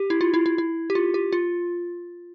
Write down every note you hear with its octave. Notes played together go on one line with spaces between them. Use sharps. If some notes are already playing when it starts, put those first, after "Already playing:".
Already playing: G4
E4
F4
E4
E4
E4
G4
F4
G4
F4